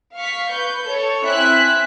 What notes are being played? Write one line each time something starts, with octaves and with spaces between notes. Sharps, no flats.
F5 C#6 B6
B4 G6
A4 C#5
C4 E4 E5 G#5 F#6 B6